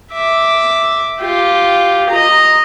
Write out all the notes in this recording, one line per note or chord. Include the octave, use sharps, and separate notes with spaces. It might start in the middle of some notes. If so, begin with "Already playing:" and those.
E5 D6
F4 G4
D#5 A#5